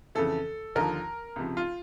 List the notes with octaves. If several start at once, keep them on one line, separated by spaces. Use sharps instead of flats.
F2 C#3 E3 A4
D#2 D3 F3 A#4
C#2 C3 F3
F4